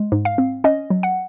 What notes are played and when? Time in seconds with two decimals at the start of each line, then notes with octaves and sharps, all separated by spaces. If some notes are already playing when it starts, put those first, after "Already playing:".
Already playing: G#3
0.12 G#2
0.25 F5
0.38 C4
0.64 C#4 D#5
0.90 F#3
1.03 F#5